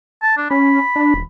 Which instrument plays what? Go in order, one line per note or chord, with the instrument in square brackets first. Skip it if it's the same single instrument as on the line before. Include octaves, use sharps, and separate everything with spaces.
[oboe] A5
D4
[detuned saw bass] C#4 [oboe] B5
[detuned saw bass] D4
D#1